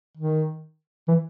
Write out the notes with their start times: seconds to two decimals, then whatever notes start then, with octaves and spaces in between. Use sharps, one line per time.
0.17 D#3
1.08 E3